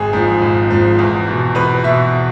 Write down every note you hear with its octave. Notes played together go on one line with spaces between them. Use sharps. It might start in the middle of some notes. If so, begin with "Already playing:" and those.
Already playing: G#1 G#4
G#2 F3
G#1
G#2 F3
E2
B2
E2 B4
B2 E5